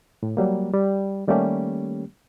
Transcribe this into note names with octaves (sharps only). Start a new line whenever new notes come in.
A2
F#3 G3 A#3
G3
D#3 G3 A3 A#3 C#4 G4